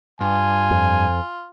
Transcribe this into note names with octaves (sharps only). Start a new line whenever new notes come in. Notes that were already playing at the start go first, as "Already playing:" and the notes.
G2 F4 G#5
F2